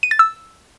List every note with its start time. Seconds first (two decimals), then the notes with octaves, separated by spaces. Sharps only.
0.03 D#7
0.11 A6
0.19 E6